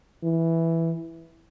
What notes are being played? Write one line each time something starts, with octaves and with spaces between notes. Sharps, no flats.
E3